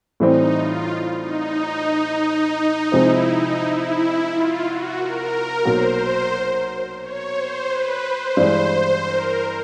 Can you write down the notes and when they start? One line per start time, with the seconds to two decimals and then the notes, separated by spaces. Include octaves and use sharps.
0.20 A2 E3 G3 C4 D#4
0.55 F4
1.22 D#4
2.92 C3 F3 G#3 C4 E4
3.27 D#4
3.60 E4
4.29 F4
4.63 F#4
4.97 A#4
5.65 B1 B2 F#3 A#3 C5
7.01 C#5
7.35 C5
7.70 B4
8.04 C5
8.37 G2 E3 G#3
9.06 A#4